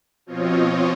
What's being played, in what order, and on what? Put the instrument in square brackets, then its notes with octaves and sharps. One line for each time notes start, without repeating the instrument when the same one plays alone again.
[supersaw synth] B2 F3 C4 F4 C#5 D#5